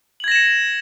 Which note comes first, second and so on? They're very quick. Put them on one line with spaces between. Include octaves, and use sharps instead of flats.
F#7 G#6 A#6 E7 C#7